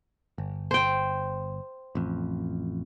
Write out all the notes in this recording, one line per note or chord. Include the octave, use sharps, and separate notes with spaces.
G1
C5 G5
A1 F2